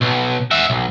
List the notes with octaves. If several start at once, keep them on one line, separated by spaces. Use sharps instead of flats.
B1
F#4 E5
B1